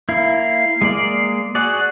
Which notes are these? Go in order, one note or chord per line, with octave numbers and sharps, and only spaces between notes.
A#3 E4 C7
G#3 A#3 D5
F#4 G#4 D5 F#6